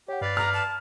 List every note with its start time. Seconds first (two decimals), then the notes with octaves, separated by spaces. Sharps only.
0.08 G4 C#5 F#5
0.21 G2 B4 D5 F5 A6
0.37 A#5 F6
0.53 A5